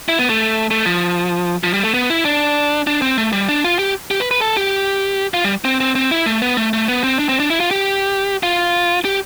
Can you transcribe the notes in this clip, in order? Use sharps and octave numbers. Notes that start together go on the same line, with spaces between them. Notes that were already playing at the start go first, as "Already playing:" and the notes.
E4
B3
A3
A3
F3
F3
G3
A3
B3
E4
D4
D4
C4
A3
G3
D4
F4
G4
G4
B4
B4
A4
G4
F4
G3
C4
C4
C4
E4
A3
B3
A3
A3
B3
C4
D4
C4
D4
E4
F4
G4
F4
G4